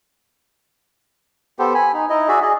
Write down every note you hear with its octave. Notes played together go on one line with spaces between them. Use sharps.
B3 G4 A4 C5
G#5 B5
D#4
D#4 E4 D#5
F#4 G#4 D5 E5
G#4 D5 D#5